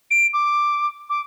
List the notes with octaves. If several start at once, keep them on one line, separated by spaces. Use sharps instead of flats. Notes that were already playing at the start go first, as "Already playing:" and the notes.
D7
D6
D6